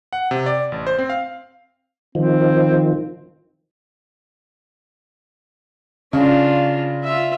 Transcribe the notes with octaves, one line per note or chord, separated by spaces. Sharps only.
F#5
C3
D5
A1
C5
C4
F5
D#3 F3 C4
C#3 D4 F4
F4 E5